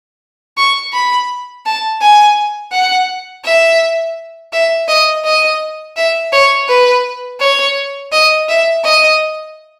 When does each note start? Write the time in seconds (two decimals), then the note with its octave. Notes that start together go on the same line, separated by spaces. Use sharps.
0.57 C#6
0.93 B5
1.65 A5
2.01 G#5
2.72 F#5
3.44 E5
4.53 E5
4.88 D#5
5.25 D#5
5.96 E5
6.32 C#5
6.68 B4
7.40 C#5
8.12 D#5
8.48 E5
8.84 D#5